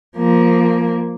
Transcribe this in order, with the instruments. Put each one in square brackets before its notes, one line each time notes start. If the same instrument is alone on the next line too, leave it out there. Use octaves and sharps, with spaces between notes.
[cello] F3 A#3